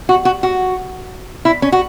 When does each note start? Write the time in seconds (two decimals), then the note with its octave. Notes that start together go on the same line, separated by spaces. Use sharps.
0.09 F#4
0.25 F#4
0.43 F#4
1.45 E4
1.62 C#4
1.72 F#4